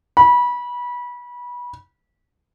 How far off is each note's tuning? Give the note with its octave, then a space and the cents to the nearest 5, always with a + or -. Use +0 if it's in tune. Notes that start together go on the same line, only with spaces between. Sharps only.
B5 -25